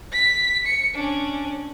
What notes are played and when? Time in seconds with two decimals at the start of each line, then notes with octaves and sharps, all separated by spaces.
0.12 B6
0.66 C#7
0.95 C#4 D4